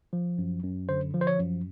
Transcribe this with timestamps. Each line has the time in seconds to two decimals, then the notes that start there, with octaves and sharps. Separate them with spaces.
0.13 F3
0.38 F#2
0.64 F#2
0.89 D3 C5
1.14 F3
1.21 C5
1.27 C#5
1.39 F#2